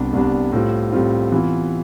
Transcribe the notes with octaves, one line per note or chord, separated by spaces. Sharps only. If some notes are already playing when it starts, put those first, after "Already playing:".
Already playing: C2 C3 G3 B3 D4
C2 C3 G3 B3 D4
A2 G3 C4 F4
A2 G3 C4 F4
C3 E3 B3 F4